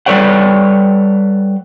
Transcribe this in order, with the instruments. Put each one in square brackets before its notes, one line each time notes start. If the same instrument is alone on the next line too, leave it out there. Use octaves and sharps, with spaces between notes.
[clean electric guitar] G3 A4 B4 C#5 D5 F#5